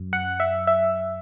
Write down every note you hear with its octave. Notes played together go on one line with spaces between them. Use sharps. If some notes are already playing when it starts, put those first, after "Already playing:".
Already playing: F#2
F#5
E5
E5